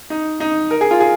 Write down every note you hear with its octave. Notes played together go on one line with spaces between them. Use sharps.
D#4
D#4
A#4
G#4
F4
G#4